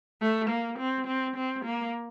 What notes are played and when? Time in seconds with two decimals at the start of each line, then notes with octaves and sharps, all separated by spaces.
0.21 A3
0.50 A#3
0.78 C4
1.07 C4
1.36 C4
1.65 A#3